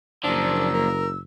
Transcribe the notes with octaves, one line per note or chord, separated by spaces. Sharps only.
F#1 A#2 F3 D4 E6
A#4